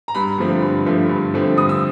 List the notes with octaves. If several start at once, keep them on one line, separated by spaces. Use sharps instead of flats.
A#5
G2 B5
D3 F3 A3 C4
G2
D3 F3 A3 C4
G2
D3 F3 A3 C4
G2 D#6
E6